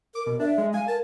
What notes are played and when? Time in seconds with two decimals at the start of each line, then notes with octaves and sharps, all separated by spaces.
0.15 A#4 D6
0.27 B2
0.39 D4 E5
0.58 G#3
0.74 F5 G#5
0.88 A#4 A5